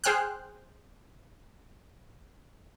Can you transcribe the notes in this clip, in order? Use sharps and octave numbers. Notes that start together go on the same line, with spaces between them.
G#4 C5 G5 F6 F#6